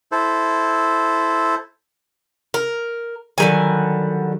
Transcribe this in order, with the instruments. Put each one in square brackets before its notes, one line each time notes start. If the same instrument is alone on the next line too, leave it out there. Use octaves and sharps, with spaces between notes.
[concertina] E4 A4 C5
[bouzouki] A#4
[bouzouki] D3 G3 G#5 [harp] D#3 F#3 A#4